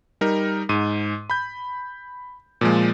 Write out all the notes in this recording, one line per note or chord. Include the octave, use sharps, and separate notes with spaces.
G3 D#4 A#4
G#2 D#7
B5 G6
A#2 F3 G#3